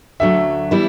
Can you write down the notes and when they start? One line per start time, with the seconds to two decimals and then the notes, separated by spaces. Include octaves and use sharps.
0.20 D2 D3 F#3 A3 E5
0.71 E3 G3 B3 E4